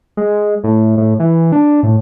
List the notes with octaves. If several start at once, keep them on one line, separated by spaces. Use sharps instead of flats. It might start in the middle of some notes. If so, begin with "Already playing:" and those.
G#3
A2
A2
E3
D4
A2